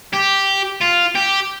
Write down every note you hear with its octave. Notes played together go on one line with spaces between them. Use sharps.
G4
F4
G4